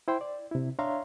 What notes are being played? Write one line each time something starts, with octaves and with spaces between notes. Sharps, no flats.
E4 C5 G5 C6
D5
C3 E4
D4 C#5 E5 F5 A#5 C6